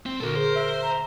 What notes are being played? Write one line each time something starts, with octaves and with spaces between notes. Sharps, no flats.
C4
A#2 D3 F#4 A4 A#4
G#4 C5
E5
A#5